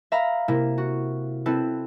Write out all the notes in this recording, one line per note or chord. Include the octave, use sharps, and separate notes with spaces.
E5 F5 A#5 B5
C3 A#3 E4
F#4
C4 E4 A4 B4